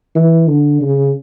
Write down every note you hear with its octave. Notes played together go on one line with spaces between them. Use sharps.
E3
D3
C#3